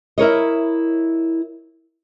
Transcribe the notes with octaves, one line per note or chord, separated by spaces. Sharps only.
E4 A#4 C#5 D#5